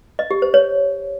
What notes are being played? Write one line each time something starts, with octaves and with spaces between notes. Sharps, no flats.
D#5
G4
C5
C#5